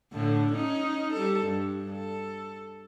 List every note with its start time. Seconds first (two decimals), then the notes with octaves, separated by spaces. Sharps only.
0.12 A2 D3
0.53 C#4 D#4
1.13 G3 A4
1.45 G2
1.91 A4